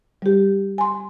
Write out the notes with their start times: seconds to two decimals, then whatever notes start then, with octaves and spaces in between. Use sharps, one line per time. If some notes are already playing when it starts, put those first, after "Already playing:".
0.22 G3 G4
0.78 G#5 C6